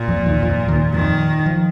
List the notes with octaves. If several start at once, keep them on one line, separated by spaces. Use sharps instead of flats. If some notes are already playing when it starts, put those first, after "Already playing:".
Already playing: A#2
F2 F3
D#2 D#3
F2 F3
D#2 D#3
F2 D#3 F3
F3